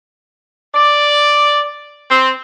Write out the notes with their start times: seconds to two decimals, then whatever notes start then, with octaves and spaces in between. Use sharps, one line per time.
0.75 D5
2.11 C4